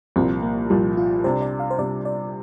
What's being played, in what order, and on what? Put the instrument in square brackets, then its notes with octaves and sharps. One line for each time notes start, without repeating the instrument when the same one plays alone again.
[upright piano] C2 A#2 F3 [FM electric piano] C4
[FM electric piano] A#3
[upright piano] C2 A#2 F3 [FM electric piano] G3
[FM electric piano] F4
[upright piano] C3 G3 D4 [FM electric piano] C5
[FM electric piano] D5
F5
C5
[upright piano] C3 G3 D4 [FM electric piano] D5
[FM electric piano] D5